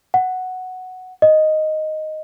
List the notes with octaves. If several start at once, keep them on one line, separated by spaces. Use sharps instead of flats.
F#5
D#5